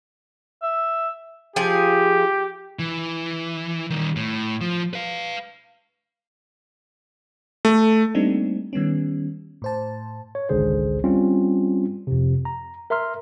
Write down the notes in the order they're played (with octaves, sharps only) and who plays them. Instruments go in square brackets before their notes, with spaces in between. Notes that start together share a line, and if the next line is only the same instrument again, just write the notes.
[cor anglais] E5
[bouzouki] F3 F4 G#4 [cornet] G4
[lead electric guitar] E3
D#3 G3
A2
F3
B4 F5
[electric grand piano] A3
[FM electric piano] G3 A3 A#3 C4 D4 D#4
D#3 G3 B3 C#4
A2 C5 A5
[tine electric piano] C#5
G#1 C#2 D3 G#4 C5
G3 C4 C#4 F4
F2 C3
A#5
A#4 E5 A#5 C6 F6